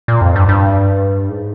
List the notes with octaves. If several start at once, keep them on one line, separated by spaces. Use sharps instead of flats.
A#2
F2
G2
G2
G#2